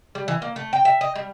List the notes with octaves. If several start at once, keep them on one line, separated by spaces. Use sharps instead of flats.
G3
E3
A#3
A3
G5
E5
D#5
G3